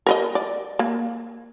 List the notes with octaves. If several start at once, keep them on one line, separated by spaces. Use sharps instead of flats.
A#4 B4 D#5
D5
A#3